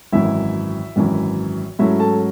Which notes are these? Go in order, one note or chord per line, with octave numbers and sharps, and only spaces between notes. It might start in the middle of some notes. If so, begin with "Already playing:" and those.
G#1 F#2 E3 E4 E5
G#1 F#2 E3
G#2 F#3 A3 C#4 E4 E5
A4 A5